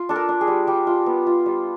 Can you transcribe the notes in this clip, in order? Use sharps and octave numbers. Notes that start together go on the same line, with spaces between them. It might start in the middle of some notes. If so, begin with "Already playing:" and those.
Already playing: F4
D4 A4
A#4
D4
G#4
G3
G3 G4
F4
B3
F4
G3